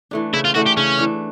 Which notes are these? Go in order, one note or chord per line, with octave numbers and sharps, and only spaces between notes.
E3 A3 D4
C#3 E4
F4
E3 A3 D4 F#4
G4
C#3 C#4
E3 A3 D4